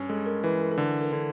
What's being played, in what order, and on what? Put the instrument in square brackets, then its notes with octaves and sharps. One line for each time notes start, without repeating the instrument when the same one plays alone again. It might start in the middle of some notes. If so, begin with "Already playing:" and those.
Already playing: [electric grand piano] G2 C#4
[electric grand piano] G#3 [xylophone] A4
[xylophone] A#4
[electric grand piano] E3 [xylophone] B4
[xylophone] A#4
A4
[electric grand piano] D3 [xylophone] A#4
[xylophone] A#4
[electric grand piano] D3